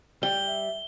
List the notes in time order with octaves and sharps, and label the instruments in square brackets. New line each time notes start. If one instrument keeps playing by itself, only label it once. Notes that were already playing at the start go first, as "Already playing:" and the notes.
[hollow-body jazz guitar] G3 [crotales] G7
[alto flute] E5